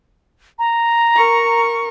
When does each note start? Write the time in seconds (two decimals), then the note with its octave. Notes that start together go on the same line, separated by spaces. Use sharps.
0.59 A#5
1.17 A#4 C#6